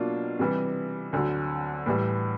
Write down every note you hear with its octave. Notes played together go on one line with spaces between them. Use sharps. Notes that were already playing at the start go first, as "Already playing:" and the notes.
Already playing: B2 F#3 A#3 D4 F4
C3 E3 G3
D2 D3 F#3
A2 E3 G3